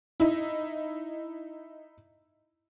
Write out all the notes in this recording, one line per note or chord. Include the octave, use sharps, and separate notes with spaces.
D#4 E4